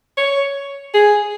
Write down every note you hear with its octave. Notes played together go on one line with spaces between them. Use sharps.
C#5
G#4